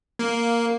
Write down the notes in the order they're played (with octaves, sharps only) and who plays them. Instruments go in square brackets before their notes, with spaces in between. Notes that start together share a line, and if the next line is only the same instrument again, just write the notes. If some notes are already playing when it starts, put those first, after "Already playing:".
[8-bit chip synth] A#3